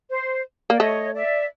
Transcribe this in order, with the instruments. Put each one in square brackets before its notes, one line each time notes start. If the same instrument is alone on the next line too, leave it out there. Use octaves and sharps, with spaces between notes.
[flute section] C5
[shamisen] A#3 [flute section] D5
[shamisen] A3 [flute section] C#5 D#5
[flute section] D5 E5